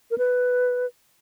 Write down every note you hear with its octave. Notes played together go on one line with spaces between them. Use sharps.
A#4
B4